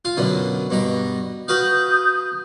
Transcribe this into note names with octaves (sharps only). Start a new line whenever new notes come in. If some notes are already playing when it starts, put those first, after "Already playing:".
F4 F5
F#2 B2 D3
G2 B2 A#5
F#4 B4 F5 D#6 G6